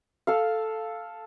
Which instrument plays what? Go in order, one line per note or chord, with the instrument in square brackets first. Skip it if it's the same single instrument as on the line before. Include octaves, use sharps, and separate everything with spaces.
[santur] A4 F5